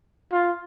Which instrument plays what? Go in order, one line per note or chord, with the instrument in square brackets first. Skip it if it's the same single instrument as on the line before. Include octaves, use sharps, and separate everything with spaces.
[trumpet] F4